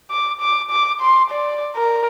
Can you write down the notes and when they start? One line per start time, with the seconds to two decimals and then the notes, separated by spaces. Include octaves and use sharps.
0.11 D6
0.41 D6
0.71 D6
1.01 C6
1.31 D5
1.76 A#4